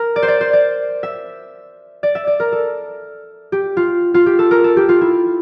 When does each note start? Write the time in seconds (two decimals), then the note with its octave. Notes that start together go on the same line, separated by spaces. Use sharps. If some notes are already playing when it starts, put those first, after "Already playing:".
Already playing: A#4
0.16 D5
0.23 C5
0.28 D5
0.41 C5
0.53 D5
1.03 E5
2.03 D5
2.15 E5
2.27 D5
2.40 A#4
2.52 A4
3.52 G4
3.77 F4
4.14 F4
4.26 G4
4.39 A4
4.51 A#4
4.64 A4
4.77 G4
4.89 F4
5.01 E4